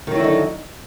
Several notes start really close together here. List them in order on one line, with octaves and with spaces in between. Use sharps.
D#3 F#3 E4 D3 D#4